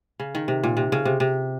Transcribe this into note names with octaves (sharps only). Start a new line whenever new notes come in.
C#3
D#3
C3
A#2
C3
C#3
C3
C3